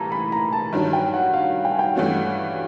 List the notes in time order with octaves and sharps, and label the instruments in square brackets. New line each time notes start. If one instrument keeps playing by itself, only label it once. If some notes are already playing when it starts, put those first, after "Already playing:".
Already playing: [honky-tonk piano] A2 E3 G3 A#3 [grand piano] A5 A#5
[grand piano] B5
A#5
A5
[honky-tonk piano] G2 D#3 F#3
[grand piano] G5
F#5
F5
G5
G#5
G5
[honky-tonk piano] G2 E3 A3 C#4 F#4